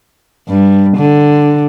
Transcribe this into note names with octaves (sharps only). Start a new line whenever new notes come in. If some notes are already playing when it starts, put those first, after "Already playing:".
G2
D3